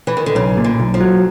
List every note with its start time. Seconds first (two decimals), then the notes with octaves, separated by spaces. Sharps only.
0.07 E3
0.17 D#3
0.26 D3
0.35 B1 C#3
0.57 A#2
0.64 D3
0.80 B1
0.94 F3
1.00 F#3